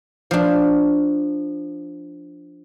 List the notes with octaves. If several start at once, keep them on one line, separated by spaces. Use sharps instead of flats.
F3 D4